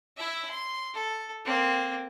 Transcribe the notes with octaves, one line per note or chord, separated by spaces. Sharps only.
E4 E5
C6
A4
A#3 C4